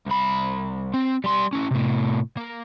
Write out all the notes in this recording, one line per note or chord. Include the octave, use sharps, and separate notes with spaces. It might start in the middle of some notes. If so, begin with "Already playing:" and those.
C2 B5
C4
G3 C6
C#4 E4
A2 C3
A#3